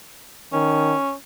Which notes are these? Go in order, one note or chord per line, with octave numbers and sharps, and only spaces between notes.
D#3 C#4